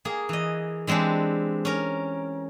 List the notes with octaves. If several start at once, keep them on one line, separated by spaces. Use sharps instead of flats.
A#3 G#4
E3 D#5
E3 G#3 C4 D4 G4
C#4 A#4